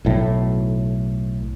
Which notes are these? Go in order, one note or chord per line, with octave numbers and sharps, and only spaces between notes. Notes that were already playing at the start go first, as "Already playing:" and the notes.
B1 A2